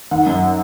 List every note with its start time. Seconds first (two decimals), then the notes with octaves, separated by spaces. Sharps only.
0.11 D#3 F#5
0.26 F#2